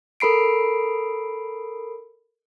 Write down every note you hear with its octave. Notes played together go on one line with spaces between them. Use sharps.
A4 A#4 B5 C7 D7